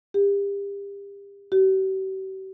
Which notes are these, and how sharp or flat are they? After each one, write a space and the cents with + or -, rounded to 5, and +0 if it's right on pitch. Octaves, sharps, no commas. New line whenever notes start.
G4 +35
G4 -45